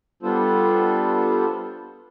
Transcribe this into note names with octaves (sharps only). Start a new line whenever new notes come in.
G3 B3 D4 F4 A4 C5